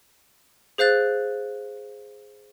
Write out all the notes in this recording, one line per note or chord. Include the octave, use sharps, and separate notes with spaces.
G#4 C5 F5 F#6 A6